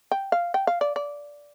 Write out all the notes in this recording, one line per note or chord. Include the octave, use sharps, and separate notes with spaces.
G5
F5
G5
F5
D5
D5